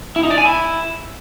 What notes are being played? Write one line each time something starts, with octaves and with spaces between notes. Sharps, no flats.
E4
D#4
D5
G#5
E4